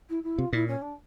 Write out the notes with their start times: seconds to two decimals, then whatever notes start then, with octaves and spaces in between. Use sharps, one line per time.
0.09 E4
0.23 E4
0.38 C3 F4
0.53 A#2 E4
0.67 C#4
0.82 D4